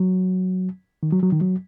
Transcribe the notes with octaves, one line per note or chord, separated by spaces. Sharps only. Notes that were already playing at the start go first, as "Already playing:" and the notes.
Already playing: F#3
D#3
F#3
F#3
D#3
F#3